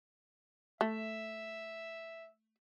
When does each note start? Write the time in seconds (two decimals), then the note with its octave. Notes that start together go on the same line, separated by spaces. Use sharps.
0.81 A3 E5